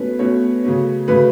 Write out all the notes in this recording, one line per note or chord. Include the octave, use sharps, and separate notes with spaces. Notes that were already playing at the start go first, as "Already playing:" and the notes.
Already playing: B2 A3 C#4 B4
B2 A3 C#4 C#5
C#3 F#3 A3 C#4
C#3 F#3 A3 C#4 B4